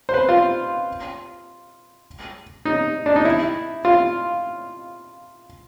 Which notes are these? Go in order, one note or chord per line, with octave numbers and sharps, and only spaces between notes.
C5
B4
F4
D#4
D4
D#4
E4
F4